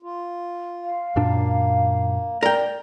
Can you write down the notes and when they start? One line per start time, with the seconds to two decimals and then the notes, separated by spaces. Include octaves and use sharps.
0.03 F4
0.84 F5
1.16 F#2 A#2 A#3 D4
2.43 A#4 D5 G5